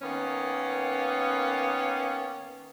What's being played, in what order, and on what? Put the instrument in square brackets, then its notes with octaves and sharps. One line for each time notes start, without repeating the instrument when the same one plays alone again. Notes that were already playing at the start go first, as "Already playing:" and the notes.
[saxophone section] D#3 A#3 B3 C#4